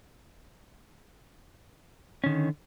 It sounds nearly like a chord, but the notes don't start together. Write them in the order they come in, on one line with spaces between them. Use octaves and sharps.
C#4 D#3 D3